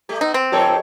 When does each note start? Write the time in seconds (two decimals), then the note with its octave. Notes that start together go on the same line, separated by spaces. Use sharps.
0.09 G3 A3 G4
0.21 B3 D#4
0.34 C4
0.52 F2 G4 A4 A#4 C#5